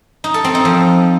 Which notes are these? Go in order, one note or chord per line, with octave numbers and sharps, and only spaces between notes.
D#4
A4
C4
D#4
F3